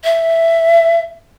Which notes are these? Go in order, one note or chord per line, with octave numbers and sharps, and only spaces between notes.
E5